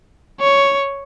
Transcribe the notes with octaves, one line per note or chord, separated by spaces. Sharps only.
C#5